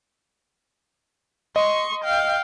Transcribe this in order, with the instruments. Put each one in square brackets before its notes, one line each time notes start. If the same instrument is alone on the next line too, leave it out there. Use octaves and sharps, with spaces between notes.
[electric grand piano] D#5 [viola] C6 C#6
[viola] F5 G5